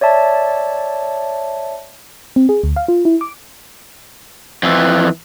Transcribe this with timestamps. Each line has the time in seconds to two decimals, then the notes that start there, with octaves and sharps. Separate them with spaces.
0.01 C#5 D5 E5 A5
2.36 C4
2.49 G#4
2.64 D2
2.76 F5
2.88 F4
3.05 E4
3.21 D6
4.63 F2 E3